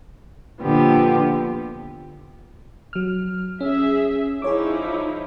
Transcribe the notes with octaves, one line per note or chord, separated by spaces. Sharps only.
A#2 D3 F3 B3 G4
F#3 F6
C#4 G#4 E5
F3 D#4 E4 G#4 C#5 D6